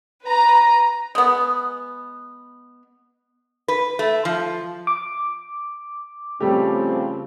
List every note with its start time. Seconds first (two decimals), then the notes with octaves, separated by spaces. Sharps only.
0.24 B4 A#5
1.15 G#3 B3
3.68 B4
3.99 A3
4.25 F3
4.87 D6
6.40 C#3 F3 G3 A3 C4 G4